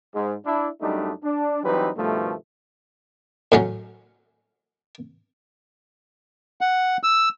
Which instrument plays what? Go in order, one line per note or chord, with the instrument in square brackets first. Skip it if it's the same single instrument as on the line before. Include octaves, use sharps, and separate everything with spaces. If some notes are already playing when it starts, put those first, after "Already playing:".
[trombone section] G#2
D4 E4
F#2 G3 A3 D4 D#4
D4
E3 F#3 G3 C4 D#4 B4
G2 B2 D#3 F3 A3
[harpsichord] A2 F#3 C#4
[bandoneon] F#5
E6